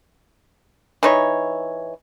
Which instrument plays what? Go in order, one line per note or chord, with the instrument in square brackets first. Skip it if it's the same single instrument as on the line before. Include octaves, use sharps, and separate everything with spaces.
[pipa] E3 D#4 C#5